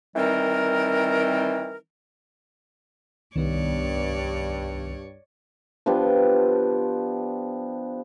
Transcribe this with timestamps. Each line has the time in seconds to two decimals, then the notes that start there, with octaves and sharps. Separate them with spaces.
0.16 D#3 E3 G3 C4 A#4
3.36 C2 G2 D#3 B3 C#5 D5
5.86 F3 B3 D4 G4